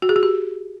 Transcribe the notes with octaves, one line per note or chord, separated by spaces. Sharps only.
F#4
G#4
F#4
G4